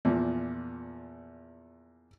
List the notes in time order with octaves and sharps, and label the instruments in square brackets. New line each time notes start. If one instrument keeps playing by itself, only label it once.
[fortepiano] E2 A#2 F3